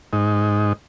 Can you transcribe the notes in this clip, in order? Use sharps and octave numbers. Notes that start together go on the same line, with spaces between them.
G#2 D#4